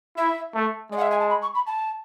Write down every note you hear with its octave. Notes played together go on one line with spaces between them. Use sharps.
E4 E5
A3
G#3 D5
F#5
E5
G#5
A5
B5
C#6
B5
A5